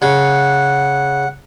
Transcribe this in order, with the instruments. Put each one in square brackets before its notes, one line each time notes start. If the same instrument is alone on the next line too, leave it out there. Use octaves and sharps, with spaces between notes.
[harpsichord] C#3 [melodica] F#5